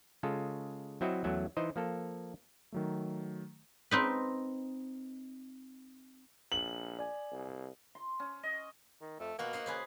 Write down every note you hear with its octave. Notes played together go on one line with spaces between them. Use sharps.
C#3 G#3 F4 A4
F#3 C4 E4 F#4 D#5 E5
E2 F#3 A3 C#4 E5 F#5
E3 D#4 C5 D#5
F3 A#3 A4
D#3 F#3 A3
C4 D#4 B4
A#1 F#7
D5 G#5
C2
C6
C#4
D#5
D#3
F2 A3
B2 A#3 F4 F#4 F#5
C5 D#5 F#5
C#3 G#4 B4 C5